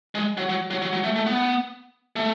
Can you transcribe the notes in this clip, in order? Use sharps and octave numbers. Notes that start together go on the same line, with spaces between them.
G#3
F#3
F#3
F#3
F#3
F#3
A3
A3
B3
A3